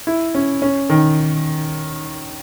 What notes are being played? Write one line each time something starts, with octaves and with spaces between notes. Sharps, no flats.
E4
C#4
C#4
D#3